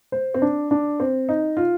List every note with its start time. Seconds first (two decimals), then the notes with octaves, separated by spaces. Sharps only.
0.12 C5
0.34 C4
0.42 D4
0.71 D4
1.00 C4
1.29 D#4
1.57 F4